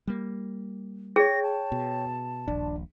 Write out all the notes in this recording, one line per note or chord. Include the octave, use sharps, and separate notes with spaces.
G3 A#3
G#4 C#5 G5 A#6
A5
B2
D#1 A#1 D4